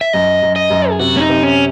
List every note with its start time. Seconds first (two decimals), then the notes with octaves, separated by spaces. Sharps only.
0.01 E5
0.13 F#2 D#5
0.42 F#2
0.56 D#5
0.70 F#2
0.90 G#4
0.99 C3 F#4
1.17 C#4
1.21 D#4
1.29 C3
1.43 C#4